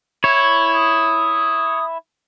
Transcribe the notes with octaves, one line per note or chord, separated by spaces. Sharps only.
E4 C#5
D#6